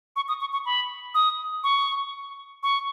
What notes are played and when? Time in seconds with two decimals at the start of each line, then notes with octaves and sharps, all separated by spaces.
0.16 C#6
0.28 D#6
0.41 C#6
0.53 C#6
0.65 B5
1.15 D#6
1.64 C#6
2.63 C#6